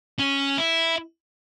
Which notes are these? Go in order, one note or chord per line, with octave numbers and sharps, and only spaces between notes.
C#4
E4